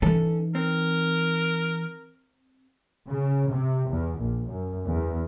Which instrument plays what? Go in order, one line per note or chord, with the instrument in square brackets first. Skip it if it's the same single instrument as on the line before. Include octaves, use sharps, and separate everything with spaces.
[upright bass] E3 D#4 [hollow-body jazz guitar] C#4 A4
[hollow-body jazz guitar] C4 [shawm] A#4
[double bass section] C#3
C3
E2
A#1
F#2
E2